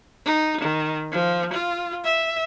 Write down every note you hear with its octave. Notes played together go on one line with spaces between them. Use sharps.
D#4
D#3
F3
F4
E5